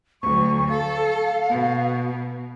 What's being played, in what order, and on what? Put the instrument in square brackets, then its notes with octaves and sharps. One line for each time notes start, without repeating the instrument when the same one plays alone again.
[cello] D2 F#3 [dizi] C#6
[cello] A4 [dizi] F5
[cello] B2